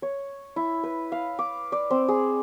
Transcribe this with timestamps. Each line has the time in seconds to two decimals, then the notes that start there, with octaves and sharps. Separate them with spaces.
0.02 C#5
0.56 E4
0.83 B4
1.12 F5
1.39 D6
1.72 D5
1.91 C4
2.08 G#4